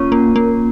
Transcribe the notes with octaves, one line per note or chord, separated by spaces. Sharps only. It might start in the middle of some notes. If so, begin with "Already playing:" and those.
Already playing: A#3 C#4 F4
A#3
A#3